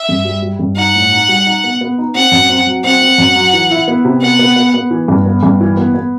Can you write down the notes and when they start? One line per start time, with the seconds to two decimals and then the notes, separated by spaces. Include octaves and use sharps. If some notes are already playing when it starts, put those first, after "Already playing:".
Already playing: E5
0.09 G2
0.25 G3
0.42 G3
0.59 G2
0.77 D#4 F#5
0.95 A2
1.12 D#4
1.29 G3
1.46 D#4
1.64 B3
1.81 B3
1.98 D#4
2.15 C4 F#5
2.32 F#2
2.50 C4
2.67 F#3
2.84 C4 F#5
3.01 C4
3.18 F#2
3.35 F#3
3.53 E3
3.71 E4
3.88 B3
4.05 C3
4.22 B3 F#5
4.39 B3
4.56 B3
4.74 B3
4.91 E3
5.08 G2
5.26 B3
5.43 G2
5.61 E3
5.77 B3
5.94 B3